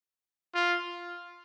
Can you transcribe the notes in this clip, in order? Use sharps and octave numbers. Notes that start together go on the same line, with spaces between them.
F4